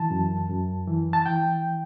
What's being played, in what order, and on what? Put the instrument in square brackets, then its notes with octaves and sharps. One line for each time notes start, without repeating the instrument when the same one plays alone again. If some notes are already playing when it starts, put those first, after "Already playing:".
Already playing: [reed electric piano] E3 A5
F#2
F#2
E3
A5
E3 G5